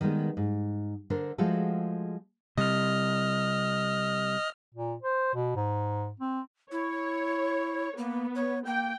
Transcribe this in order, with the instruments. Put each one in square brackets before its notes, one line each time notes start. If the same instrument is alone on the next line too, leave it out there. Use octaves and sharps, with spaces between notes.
[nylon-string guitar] D#3 G3 G#3 B3
G#2
D3 D4 A#4 C5
F3 G#3 A3 F4 F#4 A4
[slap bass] C3 G3 [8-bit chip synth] D#5 F6
[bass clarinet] A#2
C5
B2
G#2
C4
[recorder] E4 [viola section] C#5
[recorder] A#3 [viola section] B3
[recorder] C#5
[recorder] A#3 [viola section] G5